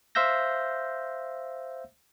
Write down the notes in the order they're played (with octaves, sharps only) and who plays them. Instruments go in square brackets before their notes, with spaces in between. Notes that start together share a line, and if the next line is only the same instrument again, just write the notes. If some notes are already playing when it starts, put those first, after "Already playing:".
[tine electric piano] C5 E5 F5 E6 G6 A#6